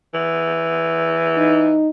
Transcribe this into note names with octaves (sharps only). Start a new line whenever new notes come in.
E3
D#4